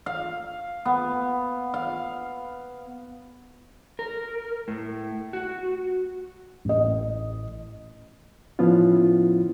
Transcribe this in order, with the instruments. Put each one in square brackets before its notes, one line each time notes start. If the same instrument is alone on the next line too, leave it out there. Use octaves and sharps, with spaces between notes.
[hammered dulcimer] F5
B3
F5
[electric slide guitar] A#4
A2
F#4
[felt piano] A1 D#5
[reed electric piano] A2 F3 B3 C#4 E4 F4